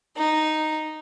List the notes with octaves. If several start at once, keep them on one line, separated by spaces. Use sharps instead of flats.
D#4